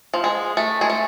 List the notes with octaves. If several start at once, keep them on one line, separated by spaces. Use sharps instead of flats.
F3
G#3
A3
G#3
A3